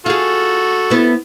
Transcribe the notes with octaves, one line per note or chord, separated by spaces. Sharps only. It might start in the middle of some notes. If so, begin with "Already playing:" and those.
F4 F#4 G#4 A4
B3 E4